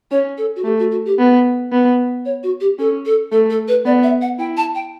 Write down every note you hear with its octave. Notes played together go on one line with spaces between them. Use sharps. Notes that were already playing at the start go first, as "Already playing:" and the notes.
C#4 C#5
A4
F#4
A3 G4
F#4
F#4
G4
B3
B3
C#5
F#4
G4
C#4 A4
A4
A3 A4
A4
B4
B3 D5
E5
F#5
E4 G5
A5
G5